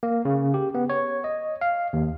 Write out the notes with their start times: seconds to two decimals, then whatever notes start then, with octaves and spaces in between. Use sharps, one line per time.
0.03 A#3
0.25 C#3
0.54 G4
0.75 B3
0.90 C#5
1.24 D#5
1.61 F5
1.93 D#2